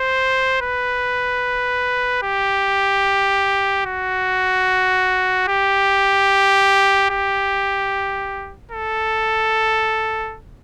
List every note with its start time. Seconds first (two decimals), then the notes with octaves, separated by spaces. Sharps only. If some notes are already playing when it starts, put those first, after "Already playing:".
Already playing: C5
0.61 B4
2.23 G4
3.86 F#4
5.47 G4
7.10 G4
8.71 A4